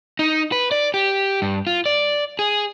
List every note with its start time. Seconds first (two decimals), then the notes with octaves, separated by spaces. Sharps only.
0.19 D#4
0.52 B4
0.71 D5
0.94 G4
1.42 G2
1.67 F4
1.86 D5
2.39 G#4